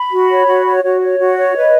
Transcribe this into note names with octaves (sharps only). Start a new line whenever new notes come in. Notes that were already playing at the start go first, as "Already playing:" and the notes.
Already playing: B5
F#4
C#5
F#4
C#5
F#4 C#5
C#5
F#4
C#5
B4 D#5